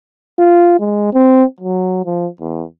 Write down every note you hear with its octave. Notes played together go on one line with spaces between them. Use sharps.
F4
G#3
C4
F#3
F3
E2